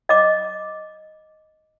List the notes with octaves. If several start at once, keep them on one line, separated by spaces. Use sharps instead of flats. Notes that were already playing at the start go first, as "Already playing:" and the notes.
D#5 D6